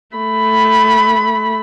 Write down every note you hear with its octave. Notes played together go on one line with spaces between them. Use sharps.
A3 B5